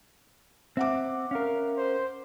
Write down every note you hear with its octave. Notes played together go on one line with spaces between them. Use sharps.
C4 E5 F#5 D6
C#4 A#4 F5
C5